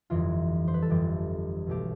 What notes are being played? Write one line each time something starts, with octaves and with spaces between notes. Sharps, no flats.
G1 F2 E3 F4
C5
B4
A4
G1 F2 E3 G4
B1 B2 A3 G4